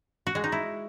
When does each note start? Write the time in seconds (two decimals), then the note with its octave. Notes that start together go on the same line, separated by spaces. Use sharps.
0.27 F#4
0.35 G#3
0.44 D#4
0.52 E4